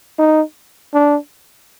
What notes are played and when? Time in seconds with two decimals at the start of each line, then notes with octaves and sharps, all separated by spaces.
0.19 D#4
0.94 D4